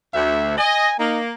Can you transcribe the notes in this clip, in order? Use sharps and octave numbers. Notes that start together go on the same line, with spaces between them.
D2 E5
D#5 G#5
A#3 D#4